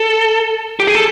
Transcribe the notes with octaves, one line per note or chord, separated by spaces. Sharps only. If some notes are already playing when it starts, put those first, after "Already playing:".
Already playing: A4
G4
G#4
A4